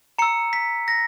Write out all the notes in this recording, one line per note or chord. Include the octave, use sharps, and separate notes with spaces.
A#5 E6 C#7
B6
A#6